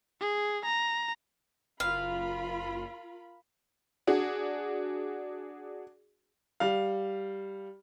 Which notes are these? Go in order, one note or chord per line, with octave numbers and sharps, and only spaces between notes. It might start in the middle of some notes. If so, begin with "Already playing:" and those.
G#4
A#5
F#1 F4 A#4 F5 B5
D4 F#4 G#4
G3 F5